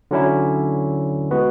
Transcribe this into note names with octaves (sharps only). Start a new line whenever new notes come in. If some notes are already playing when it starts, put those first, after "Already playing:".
D3 F#3 C#4 E4
G#3 B3 F#4 B4